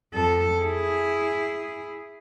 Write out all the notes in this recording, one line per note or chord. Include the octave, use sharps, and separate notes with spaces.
F2 A4
E4 G#4